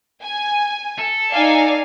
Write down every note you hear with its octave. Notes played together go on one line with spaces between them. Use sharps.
G#5
A4
D#4 D5 F5 G#5